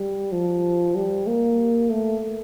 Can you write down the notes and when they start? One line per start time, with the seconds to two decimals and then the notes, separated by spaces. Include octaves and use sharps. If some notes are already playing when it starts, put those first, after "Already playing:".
Already playing: G3
0.33 F3
0.96 G3
1.27 A#3
1.90 A3